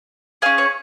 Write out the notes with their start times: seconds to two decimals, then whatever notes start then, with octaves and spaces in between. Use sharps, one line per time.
0.42 G#4 F5
0.46 C#4
0.58 C#5